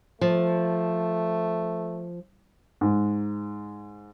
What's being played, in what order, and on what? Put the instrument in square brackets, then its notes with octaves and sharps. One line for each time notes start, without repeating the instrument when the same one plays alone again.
[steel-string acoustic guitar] F3 [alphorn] A3
[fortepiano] G#2